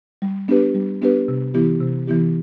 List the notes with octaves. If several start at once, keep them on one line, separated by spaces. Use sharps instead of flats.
G3
B3 D4 G4 B4
G3
B3 D4 G4 B4
C3
E3 B3 E4 G4
C3
E3 B3 E4 G4